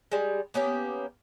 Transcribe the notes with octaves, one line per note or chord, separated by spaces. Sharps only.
G3 G#3
A#3 B3 C#4 G4